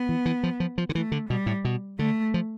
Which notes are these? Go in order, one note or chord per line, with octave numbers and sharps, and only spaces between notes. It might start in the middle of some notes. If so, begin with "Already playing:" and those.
Already playing: B3
E3
E3
F3
F3
F3
D3
E3 A3
D3
B2 G3
A2
B2
D3 A3
F3